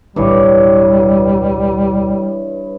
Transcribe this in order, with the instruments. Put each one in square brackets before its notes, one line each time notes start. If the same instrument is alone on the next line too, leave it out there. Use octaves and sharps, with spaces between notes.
[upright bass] D1 B1 [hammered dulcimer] G2 E3 C#5 [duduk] G3